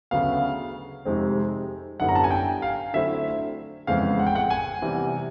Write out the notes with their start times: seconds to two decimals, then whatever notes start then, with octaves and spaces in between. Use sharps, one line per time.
0.11 D2 C#3 F#3 B3 F5
1.05 F2 C3 D#3 G#3 C4
2.00 F#2 D3 G3 B3 E4 F#5
2.09 A#5
2.15 A5
2.24 G#5
2.31 G5
2.62 F5
2.93 D3 F#3 A3 C4 E4 E5
3.87 F2 C#3 E3 G#3 B3 F5
4.19 F#5
4.27 G5
4.36 F#5
4.50 G#5
4.82 C3 E3 G3 B3